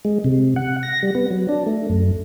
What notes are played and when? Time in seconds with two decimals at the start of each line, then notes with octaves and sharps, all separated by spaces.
0.05 G#3
0.24 C3
0.56 F#5
0.83 A#6
1.03 G3
1.15 B3
1.31 F#3
1.49 D4
1.66 A3
1.90 F#2